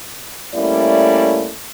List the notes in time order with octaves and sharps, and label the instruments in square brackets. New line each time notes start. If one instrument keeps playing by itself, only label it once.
[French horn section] G3 A3 A#3 C#4 E4 D5